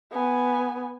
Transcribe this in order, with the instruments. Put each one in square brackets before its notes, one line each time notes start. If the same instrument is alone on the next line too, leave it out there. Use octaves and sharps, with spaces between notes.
[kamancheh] B3 G#5